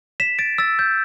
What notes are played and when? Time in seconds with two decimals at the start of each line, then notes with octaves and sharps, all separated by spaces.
0.20 B6 E7
0.39 A6 D7
0.58 E6 A6
0.79 G6